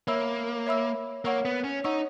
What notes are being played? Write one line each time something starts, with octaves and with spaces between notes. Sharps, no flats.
A#3 C#5 E5 B5 E6
C#5 E5 B5 E6
A#3 C#5 F#5 C#6 E6
B3
C#4
D#4 C#5 F#5 C#6 E6